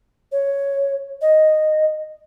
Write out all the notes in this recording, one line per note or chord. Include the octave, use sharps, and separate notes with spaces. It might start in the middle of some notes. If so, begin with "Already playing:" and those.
C#5
D#5